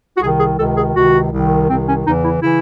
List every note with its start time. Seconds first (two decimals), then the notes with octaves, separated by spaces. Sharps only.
0.17 F#4
0.21 C2 C3 D#3 G#4
0.40 G#4
0.58 C#2 C3 D#3 A4
0.77 G#4
0.94 C#2 C3 D#3 F#4
1.31 C2 C3 D#3
1.68 C2 C3 D#3 C4
1.87 C#4
2.05 E2 C#3 E3 D#4
2.23 E4
2.42 C#3 E3 E4